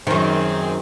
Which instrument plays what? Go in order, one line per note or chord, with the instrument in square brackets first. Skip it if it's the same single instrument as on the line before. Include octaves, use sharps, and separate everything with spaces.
[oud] F#2 D#3 [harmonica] C4 G#4 C5